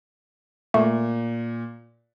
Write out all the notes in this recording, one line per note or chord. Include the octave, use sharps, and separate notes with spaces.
A#2 A3